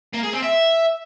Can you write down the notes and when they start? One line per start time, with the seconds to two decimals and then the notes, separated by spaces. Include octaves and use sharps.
0.13 A#3
0.23 G#4
0.33 C4
0.42 E5